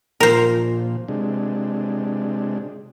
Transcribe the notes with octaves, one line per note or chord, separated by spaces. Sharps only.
A#2 F3 A#4 C5
C3 G#3 D4